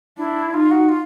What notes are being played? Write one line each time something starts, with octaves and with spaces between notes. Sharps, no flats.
D4 E4
D#4 F4
F#4
F4